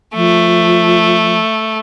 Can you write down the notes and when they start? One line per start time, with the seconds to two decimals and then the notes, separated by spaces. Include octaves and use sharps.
0.15 F3 A3